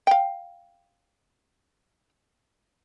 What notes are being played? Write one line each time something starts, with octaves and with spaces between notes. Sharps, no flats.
F5 G5